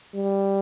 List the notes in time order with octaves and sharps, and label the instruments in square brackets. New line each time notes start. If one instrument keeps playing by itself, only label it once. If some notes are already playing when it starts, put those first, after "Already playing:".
[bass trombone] G3